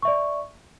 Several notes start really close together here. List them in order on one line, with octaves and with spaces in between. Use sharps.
C#6 E5 D5